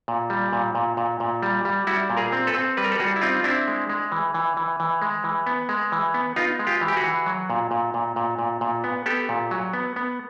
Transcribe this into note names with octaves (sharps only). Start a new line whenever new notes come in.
A#2
G3
A#2
A#2
A#2
A#2
G3
G3
G3 E4 F#4
A#2
G#4 A#4
C4
A4 B4
C4
G3 B4
A#4
A4 B4
G3 F#4 G#4
E4
C4 D#4 F4
F4
C4 D4 E4
G#3
G#3
E3
E3
E3
E3
G#3
E3
B3
G#3
E3
B3
B3 D#4 F4
G#3
F4 G4
E3
G4
F#4 G#4
E3
F#3
A#2
A#2
A#2
A#2
A#2
A#2
B3
B3 G4 A4
A#2
F#3
B3
B3